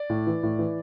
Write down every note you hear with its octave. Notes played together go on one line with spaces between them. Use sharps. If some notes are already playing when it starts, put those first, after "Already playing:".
Already playing: D5
A2
E3
A2
E3